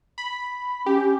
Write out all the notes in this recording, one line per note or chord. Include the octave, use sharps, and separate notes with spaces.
B5
C#4 G4